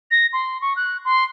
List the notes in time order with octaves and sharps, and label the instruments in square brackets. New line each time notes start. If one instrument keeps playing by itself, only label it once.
[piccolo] A#6
C6
C#6
F#6
C6